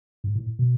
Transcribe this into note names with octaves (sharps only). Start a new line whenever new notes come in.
G#2
A2
B2